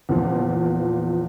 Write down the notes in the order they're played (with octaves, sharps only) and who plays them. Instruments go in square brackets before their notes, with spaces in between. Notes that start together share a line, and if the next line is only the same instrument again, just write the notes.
[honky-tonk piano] E2 A#2 F3